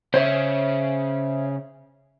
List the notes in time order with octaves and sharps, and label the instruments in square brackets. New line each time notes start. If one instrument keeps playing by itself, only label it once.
[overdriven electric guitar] C#3 [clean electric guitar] C5 C#5 E5